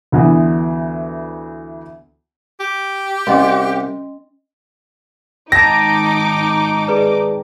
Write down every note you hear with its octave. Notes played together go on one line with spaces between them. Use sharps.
D2 E3 B3
G4
C2 C#4 D#5 C6
G#1 D#4 G5 A5 D6 A#6
G#4 B4 D5